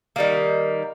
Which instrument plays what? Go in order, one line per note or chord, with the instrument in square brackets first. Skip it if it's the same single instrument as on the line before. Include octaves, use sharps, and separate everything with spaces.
[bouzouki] D#3 G3 A#3